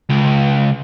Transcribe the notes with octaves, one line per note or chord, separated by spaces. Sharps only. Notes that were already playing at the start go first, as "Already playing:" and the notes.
C#2